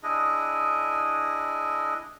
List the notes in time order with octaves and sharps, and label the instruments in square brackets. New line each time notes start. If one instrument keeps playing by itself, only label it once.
[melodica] D4 E4 G#4 D#5